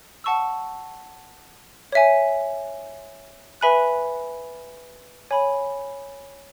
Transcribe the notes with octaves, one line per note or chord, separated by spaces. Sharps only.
F#5 A5 C#6 E6
C#5 E5 G#5
B4 E5 G#5 B5 F#6
C#5 G#5 B5